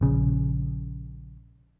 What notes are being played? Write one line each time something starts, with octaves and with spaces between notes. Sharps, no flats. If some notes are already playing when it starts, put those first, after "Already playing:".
A#1 C#3